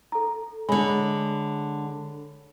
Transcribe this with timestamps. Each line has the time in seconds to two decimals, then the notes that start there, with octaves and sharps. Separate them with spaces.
0.12 A4 A#5
0.69 D3 G#3 C#5 G#5 B5